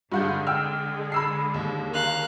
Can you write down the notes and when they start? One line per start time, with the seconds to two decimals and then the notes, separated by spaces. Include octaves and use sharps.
0.12 G2 D3 G#3 F#5 G6
0.47 G5 E6 F6
1.12 B5 E6 C7
1.54 D#2
1.91 A#4 F5 F#6